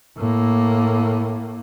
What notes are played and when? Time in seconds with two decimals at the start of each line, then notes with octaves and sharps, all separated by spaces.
0.17 A2 A#3